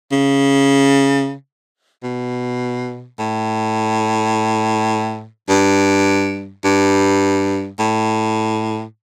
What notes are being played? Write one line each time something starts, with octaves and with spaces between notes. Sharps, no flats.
C#3
B2
A2
G2
G2
A2